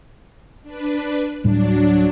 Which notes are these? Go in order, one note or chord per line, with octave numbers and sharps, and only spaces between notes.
D4 B4
D1 A2 F#3 G3 D4